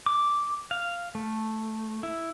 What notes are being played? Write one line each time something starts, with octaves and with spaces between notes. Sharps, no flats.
D6
F5
A3
E4